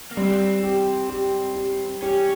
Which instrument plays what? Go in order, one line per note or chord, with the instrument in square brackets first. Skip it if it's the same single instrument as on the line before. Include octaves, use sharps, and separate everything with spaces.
[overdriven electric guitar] A#3
[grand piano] G3 [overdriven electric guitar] C4
[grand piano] G4
G4
G4
[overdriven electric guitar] C#4 [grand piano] G4